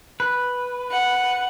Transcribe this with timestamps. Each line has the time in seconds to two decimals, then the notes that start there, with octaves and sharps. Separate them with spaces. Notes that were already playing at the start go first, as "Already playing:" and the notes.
0.20 B4
0.90 F#5